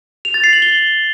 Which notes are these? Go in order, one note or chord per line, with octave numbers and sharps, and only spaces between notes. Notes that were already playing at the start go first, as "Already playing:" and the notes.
F7
A6
C7
F#7
G7